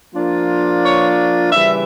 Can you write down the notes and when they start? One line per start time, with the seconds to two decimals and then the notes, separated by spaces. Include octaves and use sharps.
0.15 F3 A#3 D4 F4
0.84 C#5
1.52 C#3 E3 G3 E5